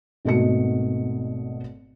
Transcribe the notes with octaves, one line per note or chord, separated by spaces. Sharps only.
G#1 B2 A3 F#4 D#5 C#7